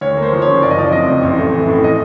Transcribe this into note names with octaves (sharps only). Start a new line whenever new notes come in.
D2 C#5
A#3
C5
F3
C#5
C#3
F#1 D5
D#5
F3 D5
C3 D#5
F2
A1
A3
E3
A2
D#5